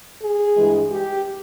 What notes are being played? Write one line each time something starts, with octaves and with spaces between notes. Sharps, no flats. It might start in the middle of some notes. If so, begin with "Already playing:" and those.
G#4
G2 E3 G#3
G4